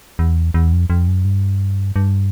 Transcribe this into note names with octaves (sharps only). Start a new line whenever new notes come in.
E2
E2
F2
F2
F#2
G2
G2